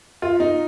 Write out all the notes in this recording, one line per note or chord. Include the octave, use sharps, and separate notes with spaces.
F4
D#4